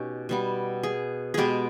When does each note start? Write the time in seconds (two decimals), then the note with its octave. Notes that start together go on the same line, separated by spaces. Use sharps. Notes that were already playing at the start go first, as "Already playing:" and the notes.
Already playing: B2 C#4 D#4 G4
0.29 B2 G3 B3
0.83 G#4
1.34 B2 G#3 B3 G4 G#4